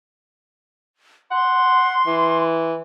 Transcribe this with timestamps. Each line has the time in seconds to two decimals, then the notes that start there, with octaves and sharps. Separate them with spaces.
1.31 F#5 C6
2.06 E3